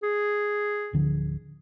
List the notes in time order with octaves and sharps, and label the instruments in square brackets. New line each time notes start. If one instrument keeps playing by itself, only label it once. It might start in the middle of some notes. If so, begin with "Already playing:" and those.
[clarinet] G#4
[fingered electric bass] D1 D3 F3